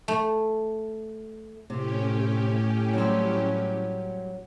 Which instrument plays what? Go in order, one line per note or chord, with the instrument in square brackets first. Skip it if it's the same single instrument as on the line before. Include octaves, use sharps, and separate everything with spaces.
[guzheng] A3
[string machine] A2 C#4 G4 [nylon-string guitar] C3
[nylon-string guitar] F#3 G3 C4